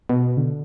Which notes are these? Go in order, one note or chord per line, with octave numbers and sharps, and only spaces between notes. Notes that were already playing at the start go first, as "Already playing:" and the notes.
B2
D3